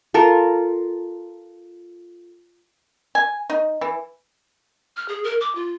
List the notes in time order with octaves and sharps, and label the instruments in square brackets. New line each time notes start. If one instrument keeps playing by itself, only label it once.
[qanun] F4 A4 A#4
[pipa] G#5
D#4
E3
[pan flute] F6
G#4
A#4
D6
F4